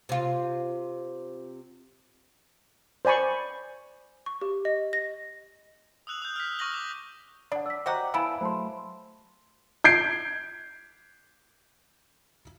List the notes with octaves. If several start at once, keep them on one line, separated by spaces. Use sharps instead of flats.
C3 F4
C5 D5 G#5 B5 C#6
C#6
G4
D#5
A#6
D#6 E6 F#6 F7 F#7
D#6 G6
F6 B6
C#6 E6 F6 A#6 F#7 G7
D6
D4 D5 F#5
D5 E6 B6
F#4 G4 C5 D#5 F#5 A#5
B3 E4 F5 G#5 A5 E6 D7 E7
F#3 A3 C5 A5 C6
G6 G#6 C7 D7